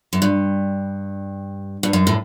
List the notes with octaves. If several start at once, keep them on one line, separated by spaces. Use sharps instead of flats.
F#2
G2
G2
F#2
A2